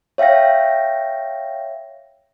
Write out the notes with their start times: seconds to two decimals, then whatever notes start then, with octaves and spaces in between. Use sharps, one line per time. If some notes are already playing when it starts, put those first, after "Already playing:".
0.18 C#5 E5 F5 G5 A#6